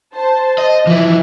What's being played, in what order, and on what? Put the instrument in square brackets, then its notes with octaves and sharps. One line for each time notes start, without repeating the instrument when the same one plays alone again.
[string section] C5 A5
[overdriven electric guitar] D#5
[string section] E3 [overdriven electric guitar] F3 E4